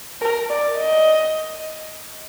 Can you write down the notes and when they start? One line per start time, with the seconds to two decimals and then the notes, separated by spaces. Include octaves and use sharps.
0.21 A#4
0.50 D5
0.78 D#5